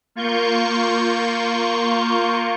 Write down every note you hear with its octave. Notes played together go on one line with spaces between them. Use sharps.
A#3 F4 C#6 G6